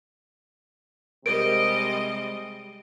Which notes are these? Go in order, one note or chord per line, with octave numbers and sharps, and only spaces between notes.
C3 G3 G#3 A#4 D#5 D7